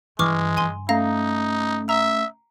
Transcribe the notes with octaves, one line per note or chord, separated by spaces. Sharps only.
G2 C#3 E3 G#3 C#6 D6 F6
G2 C#3 G#5 C6
A3 C#4 D#4 F5 A#5 A#6
E5 A#5